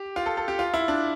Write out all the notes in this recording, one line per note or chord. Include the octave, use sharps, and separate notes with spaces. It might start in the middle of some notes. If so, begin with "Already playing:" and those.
Already playing: G4
F4
A4
A4
G4
F4
E4
D4